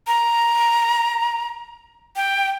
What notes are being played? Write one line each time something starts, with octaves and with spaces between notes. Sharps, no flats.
A#5
G5